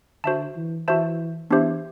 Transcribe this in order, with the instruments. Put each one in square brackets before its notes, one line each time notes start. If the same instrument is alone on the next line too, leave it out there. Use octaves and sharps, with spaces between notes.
[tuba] D3 [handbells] F#4 C5 E5 A5
[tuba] E3
[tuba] E3 [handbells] F#4 C5 E5 A5
[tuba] E3 [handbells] B3 D4 G4 C5 E5